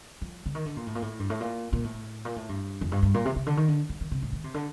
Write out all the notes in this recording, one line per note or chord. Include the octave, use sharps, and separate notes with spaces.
F3
D3
D#3
D3
A#2
A2
A#2
A2
G2
A2
A#2
A#2
A2
A#2
A2
G2
F2
G2
G2
A#2
C3
C3
D3
D#3
D3
D#3
D#3
C3
A2
D#3
C3
D3